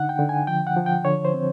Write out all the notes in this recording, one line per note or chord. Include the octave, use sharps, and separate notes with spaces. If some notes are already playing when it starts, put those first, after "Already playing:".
Already playing: D3 D#4 F#5
G5
D3
G#5
F3 G5
F#5
F3
G5
D3 C#5
C5
C4